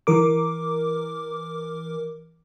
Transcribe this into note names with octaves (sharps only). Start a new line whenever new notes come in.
E3 A#4 D6